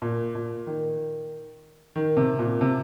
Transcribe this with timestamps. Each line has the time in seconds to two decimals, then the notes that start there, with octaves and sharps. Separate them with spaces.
0.02 A#2
0.35 A#2
0.67 D#3
1.96 D#3
2.17 C3
2.39 A#2
2.61 C3